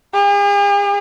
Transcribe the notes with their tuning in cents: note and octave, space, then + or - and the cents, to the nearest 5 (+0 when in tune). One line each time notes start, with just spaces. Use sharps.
G#4 -45